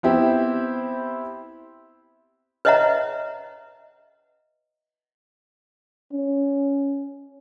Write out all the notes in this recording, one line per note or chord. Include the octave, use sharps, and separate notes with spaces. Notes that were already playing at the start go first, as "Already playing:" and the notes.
B3 C4 E4 G4
B4 C#5 D#5 E5 F#5 A#5
C#4